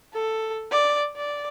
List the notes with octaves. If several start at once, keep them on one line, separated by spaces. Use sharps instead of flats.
A4
D5
D5